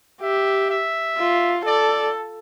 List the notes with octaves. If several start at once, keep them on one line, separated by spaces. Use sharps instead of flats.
G4 E5
E5
F4
A4 D5